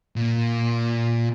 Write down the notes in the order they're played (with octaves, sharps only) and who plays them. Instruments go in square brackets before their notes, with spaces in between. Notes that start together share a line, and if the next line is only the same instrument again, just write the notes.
[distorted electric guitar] A#2